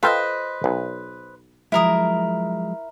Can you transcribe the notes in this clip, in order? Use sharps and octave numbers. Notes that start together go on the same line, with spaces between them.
F4 A4 B4 C5 D#5 G5
B1
F3 F#3 G#3 E4 A#4 D#6